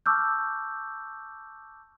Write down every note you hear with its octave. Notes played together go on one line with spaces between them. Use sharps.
A5 C#6 D6 E6 F6 G6